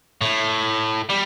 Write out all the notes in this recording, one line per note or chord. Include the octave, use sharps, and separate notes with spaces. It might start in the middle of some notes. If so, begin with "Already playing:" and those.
A2
G3